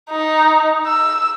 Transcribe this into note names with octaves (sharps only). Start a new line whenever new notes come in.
D#4
E6